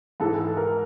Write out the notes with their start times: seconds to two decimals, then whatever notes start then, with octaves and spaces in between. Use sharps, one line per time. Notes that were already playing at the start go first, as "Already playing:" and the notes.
0.20 G#2 E3 G#3 A4
0.39 A4
0.57 A#4